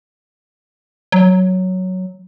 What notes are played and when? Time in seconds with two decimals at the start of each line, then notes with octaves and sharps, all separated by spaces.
1.12 F#3